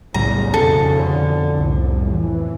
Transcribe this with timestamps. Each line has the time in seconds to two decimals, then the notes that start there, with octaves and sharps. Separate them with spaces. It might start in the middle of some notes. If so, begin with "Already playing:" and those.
0.14 B1 E2 A2 C#3 G3 A#5
0.54 F2 B2 A4
0.94 D3
1.58 C2 A2
2.11 E3